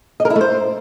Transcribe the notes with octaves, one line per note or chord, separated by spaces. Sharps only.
D#5
A#4
E4
A3
C5